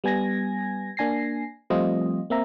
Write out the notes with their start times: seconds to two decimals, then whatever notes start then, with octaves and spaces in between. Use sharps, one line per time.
0.04 G3 B3 G#5 G#6 A#6
0.97 A#3 D4 G#5 A#6 C7
1.70 F3 G3 A3 C4 F4 D#5
2.30 A#3 C4 E5 A#5